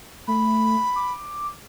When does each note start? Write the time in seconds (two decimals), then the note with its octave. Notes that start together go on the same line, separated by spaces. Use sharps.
0.28 A3 B5
0.96 D6